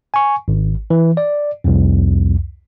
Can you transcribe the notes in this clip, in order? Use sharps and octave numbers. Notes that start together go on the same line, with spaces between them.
G#5 C#6
G#1
E3
D5
C2 F2